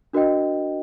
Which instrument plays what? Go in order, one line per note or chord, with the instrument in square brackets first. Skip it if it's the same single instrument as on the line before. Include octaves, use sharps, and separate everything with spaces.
[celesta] D4 F#4 A#4 D#5 G5